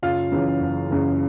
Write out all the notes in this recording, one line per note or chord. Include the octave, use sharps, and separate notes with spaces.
F#1 F4 F5
F#2 C#3 E3
F#1
F#2 C#3 E3